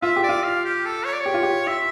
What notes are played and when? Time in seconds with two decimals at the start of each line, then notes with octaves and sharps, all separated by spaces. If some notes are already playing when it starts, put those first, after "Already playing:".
0.02 F4 E5
0.16 G4
0.23 D5
0.29 F4
0.44 F5
0.65 G4
0.85 A4
1.05 C#5
1.13 D5
1.21 C#5
1.26 G4
1.34 F4
1.43 G4
1.67 F4 E5